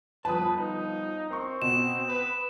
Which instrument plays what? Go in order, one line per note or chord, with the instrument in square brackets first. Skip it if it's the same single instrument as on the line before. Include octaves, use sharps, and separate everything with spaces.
[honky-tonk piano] G1 F3 D#6 [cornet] B4 [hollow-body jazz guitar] A5
[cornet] D#4
[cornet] C4 [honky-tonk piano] A#4 C6 C#6
[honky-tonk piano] B2 [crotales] E7
[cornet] B4 [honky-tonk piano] D#6